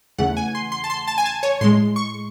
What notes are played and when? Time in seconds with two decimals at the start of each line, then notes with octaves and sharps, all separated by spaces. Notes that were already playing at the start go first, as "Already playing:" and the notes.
0.18 E2 C#3 E3 A3 F#5
0.37 G#5
0.55 C6
0.72 C6
0.84 A5
0.90 C6
1.07 A5
1.18 G#5
1.26 A5
1.43 C#5
1.61 A2 G#3 C6
1.96 C#6